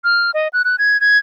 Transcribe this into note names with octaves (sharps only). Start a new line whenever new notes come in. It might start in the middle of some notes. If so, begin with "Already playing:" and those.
F6
D#5
F#6
F#6
G#6
G#6